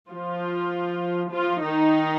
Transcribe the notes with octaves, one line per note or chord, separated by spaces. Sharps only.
F3 F4
F3 F4
D#3 D#4